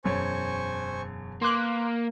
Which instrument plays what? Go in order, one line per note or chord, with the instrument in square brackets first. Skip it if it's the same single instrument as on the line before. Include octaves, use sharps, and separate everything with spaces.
[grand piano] E1 F#2 C#5 [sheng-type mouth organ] C5 G#5 C#6
[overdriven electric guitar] A#3 [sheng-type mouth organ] B4 [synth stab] C6 D6 F#6